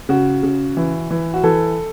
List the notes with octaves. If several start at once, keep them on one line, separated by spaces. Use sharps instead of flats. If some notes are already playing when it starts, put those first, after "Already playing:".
C#3 F#4
C#3
E3
E3
F#4
E3 A4